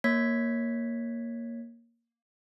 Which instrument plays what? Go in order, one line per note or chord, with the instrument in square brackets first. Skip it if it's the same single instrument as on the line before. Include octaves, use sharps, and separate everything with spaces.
[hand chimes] A#3 C#5 G#6 B6